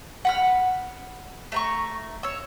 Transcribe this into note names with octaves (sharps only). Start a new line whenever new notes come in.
F#5 B5 F6
A3 A#5 C#6
C#5 E6